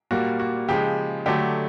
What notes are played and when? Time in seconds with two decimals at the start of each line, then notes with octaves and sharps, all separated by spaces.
0.11 A#2 G3 A#3 F#4
0.40 F#4
0.68 C#3 F3 G#3 G4
1.26 D3 F#3 A3 G4